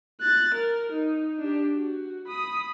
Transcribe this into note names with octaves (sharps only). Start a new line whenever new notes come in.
F#6 A6
A#4
D#4
D4 G4
F#4
B5 D#6